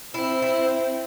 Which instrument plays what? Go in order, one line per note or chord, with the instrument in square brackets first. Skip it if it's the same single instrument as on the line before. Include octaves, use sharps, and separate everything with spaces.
[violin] C4 [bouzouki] E4
[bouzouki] E4